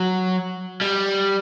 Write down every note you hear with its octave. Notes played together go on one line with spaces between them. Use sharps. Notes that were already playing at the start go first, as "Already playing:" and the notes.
Already playing: F#3
G3